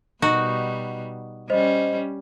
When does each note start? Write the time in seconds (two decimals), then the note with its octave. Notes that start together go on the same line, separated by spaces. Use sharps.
0.22 B2 G3 D#4 F#4
1.50 G3 C#4 C5 D#5